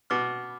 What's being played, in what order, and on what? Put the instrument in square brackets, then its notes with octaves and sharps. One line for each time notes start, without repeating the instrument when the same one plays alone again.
[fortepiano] B2 [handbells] D6 F6